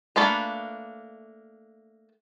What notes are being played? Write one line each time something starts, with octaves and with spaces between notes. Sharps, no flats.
A3 A#3 D4 F4 B4